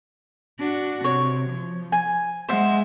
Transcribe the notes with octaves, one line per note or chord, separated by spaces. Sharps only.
D4 F#4
C3 C#5
F3
G#5
G#3 C5 E5 F#5